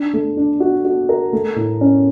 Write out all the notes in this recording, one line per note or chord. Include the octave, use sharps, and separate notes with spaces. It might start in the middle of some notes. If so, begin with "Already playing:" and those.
Already playing: D4
A3
D4
F#4
F#4
A#4
A3
A2
C#4